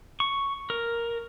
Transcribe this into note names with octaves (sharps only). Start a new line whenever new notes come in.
C#6
A#4